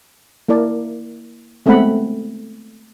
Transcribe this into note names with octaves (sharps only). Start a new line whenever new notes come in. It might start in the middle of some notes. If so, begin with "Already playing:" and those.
A#3 E4 A#4 D5 A5
G#3 A3 B3 C4 F#5 B5